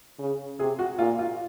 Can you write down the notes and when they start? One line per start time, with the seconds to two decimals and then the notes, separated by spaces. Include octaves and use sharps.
0.19 C#3
0.59 C3 G#4
0.79 F#4
0.98 A#2 F4
1.19 F4